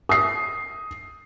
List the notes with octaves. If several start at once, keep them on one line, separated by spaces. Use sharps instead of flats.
D#6 C7